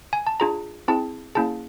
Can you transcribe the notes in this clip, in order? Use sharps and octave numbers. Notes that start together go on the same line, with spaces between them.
G#5
A5
D4 F4 G#4 A#5
C4 E4 G#4 A5
A#3 C#4 E4 G#4 A5